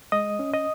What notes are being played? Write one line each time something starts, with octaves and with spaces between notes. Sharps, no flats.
G#3 D#5 D#6
C#4
D#5 D#6